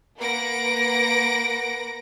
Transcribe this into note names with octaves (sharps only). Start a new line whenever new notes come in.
A#3 B4 F#5 A#6 D7